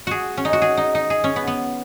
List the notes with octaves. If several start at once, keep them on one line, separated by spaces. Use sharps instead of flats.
F#4 G#4
C#4
D#4
F#4
G#4
D#4
D#4
G#4
C#4
B3
B3